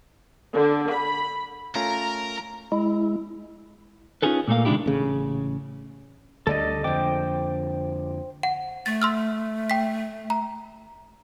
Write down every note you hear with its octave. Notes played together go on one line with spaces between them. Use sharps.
D3
B5
A3 C#4 F4 A#4 A#5
G#3 E4
C#4 D#4 F4 G#4 A4 B4
A#2 A3 A#3 F5
C3 D#3 G#3 D4 E4 G4
A1 C#3
D2 D3 G3 A4 D5 D#5
F2 D3 C5 G5 D6
F#5
A3 A6
C6 E6 F6
G5 B6
A#5